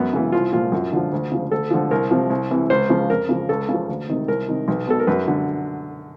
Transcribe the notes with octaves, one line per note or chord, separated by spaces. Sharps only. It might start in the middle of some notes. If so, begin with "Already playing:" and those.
Already playing: F#2 B3
C#3 E3
C2 F4
A#2 F3 F4
F#2
D3 F3
D2
C#3 F3
D2 A4
D3 F3
C2 A#4
C3 F3
C2
C3 E3
C#2 C5
C#3 F3
F2 A#4
C#3 F3
C#2 A4
C#3 F3
D2
C3 D#3
C2 A#4
C3 D#3
B1
B2 A4
A#4
F#2 B4
D3